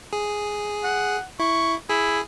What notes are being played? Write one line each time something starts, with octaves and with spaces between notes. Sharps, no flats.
G#4
F#5
E4 C#6
E4 G#4